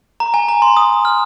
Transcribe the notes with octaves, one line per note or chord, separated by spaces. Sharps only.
A#5
G#5
A#5
C6
D#6
F6